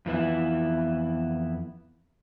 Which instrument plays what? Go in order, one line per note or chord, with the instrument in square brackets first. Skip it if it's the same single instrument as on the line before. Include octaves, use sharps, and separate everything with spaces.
[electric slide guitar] F2 E3 B3 E4